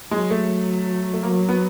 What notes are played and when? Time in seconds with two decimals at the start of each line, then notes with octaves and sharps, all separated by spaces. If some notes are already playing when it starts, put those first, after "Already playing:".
0.11 F#3 G#3
0.31 A3
1.13 A3
1.23 F#3 A#3
1.49 B3